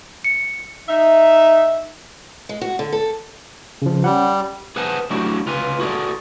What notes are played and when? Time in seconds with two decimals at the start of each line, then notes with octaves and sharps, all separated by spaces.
0.24 C#7
0.89 D#4 E5
2.49 G#3
2.61 F#4
2.79 D3
2.92 A4
3.82 C#3 F3
4.04 G3 C#4 F#5
4.76 G#4 B4 C5 F#5 G#5 A5
5.10 F#3 A3 D4 E4 F#4 G4
5.46 C#2 F4 B4 G#5
5.80 F#4 G#4 A4 D5